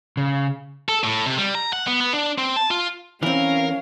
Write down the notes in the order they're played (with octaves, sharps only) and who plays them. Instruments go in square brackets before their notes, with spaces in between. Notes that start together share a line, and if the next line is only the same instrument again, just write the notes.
[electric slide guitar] C#3
[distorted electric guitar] A4
A2
C3
G3
A#5
F#5
B3
B3
D4
C4
A5
F4
[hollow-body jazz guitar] E3 C4 [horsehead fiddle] C#4 F5 [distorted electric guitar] A#4